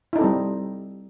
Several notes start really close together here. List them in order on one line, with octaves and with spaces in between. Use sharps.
E4 D#4 A4 C4 G3